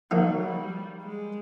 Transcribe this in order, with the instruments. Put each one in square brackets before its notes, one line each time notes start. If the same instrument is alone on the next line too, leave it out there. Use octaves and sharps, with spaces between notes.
[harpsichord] F3 A#3 D#4 [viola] F#3
[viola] G3
G#3